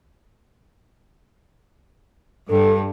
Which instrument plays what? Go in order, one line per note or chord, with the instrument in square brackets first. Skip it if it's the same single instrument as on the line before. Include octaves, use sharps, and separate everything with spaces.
[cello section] G2 [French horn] A4